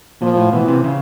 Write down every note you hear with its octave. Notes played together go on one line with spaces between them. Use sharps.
A#2 F3
A2
B2 E3
C3
C#3